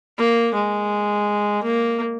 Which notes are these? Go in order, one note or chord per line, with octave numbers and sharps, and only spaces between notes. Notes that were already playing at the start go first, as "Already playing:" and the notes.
A#3
G#3
A#3